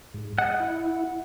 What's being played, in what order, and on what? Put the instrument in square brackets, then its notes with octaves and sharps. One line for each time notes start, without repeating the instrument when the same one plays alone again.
[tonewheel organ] G#2
[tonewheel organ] D#5 [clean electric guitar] F#5
[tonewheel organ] E4